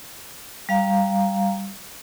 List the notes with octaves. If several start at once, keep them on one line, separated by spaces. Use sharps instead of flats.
G3 F5 A#5